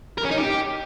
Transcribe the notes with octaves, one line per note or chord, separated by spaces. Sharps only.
A#4
C#4
D#4
G4